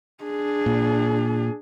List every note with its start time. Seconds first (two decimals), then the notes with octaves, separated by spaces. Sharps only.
0.24 D4 G#4
0.66 A#2